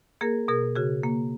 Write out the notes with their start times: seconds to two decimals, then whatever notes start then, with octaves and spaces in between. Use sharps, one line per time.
0.21 A#3 G#4 A#4
0.48 B2 G#4 A#4
0.76 C#3 F#4 G#4
1.03 A#3